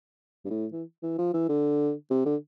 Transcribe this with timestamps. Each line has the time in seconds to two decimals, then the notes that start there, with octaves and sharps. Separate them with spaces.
0.45 G2
0.50 A2
0.72 E3
1.03 E3
1.18 F3
1.33 E3
1.49 D3
2.10 C3
2.25 D3